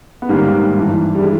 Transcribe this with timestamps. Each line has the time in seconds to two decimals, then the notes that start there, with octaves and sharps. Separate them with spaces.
0.22 B3
0.29 G#2 D#3 G3 A#3
0.75 G2 E3
1.15 G3
1.20 E3 G#3